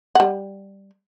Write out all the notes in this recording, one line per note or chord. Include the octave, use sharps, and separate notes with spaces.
G3 F#5